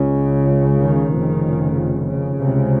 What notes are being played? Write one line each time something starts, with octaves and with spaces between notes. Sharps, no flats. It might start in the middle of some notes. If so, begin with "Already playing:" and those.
Already playing: C#2 C#3
D#3
F1 F2 C#3
C#3
C#2 C3